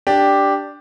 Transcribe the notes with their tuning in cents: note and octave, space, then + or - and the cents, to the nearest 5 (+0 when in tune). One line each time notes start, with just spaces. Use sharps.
D4 +0 G4 +0